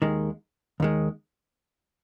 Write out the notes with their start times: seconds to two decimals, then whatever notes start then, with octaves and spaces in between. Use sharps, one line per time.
0.02 D#2 D#3 G#3
0.80 D#2 D#3 G#3